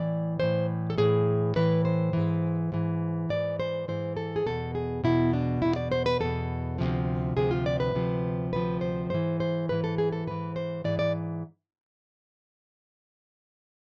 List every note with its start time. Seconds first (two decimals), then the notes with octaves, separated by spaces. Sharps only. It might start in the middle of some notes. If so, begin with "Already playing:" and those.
Already playing: A2 E3 D5
0.40 A2 E3 C5
0.90 A4
0.98 A2 E3 G#4
1.56 A2 E3 B4
1.85 C5
2.13 G#2 E3
2.72 G#2 E3
3.29 G#2 E3 D5
3.60 C5
3.88 G#2 E3 C5
4.17 A4
4.36 G#4
4.46 E2 B2 A4
4.75 G#4
5.04 E2 B2 E4
5.33 D4
5.62 E2 B2 E4
5.76 D5
5.92 C5
6.06 B4
6.20 E2 B2 A4
6.78 D2 C3 F3
7.37 D2 C3 F3 G#4
7.51 F4
7.66 D5
7.80 B4
7.94 D2 C3 F3
8.53 D2 C3 F3 B4
8.81 C5
9.10 G#2 E3 C5
9.40 C5
9.69 G#2 E3 B4
9.84 A4
9.98 G#4
10.13 A4
10.27 G#2 E3 B4
10.56 C5
10.84 G#2 E3 D5
10.99 D5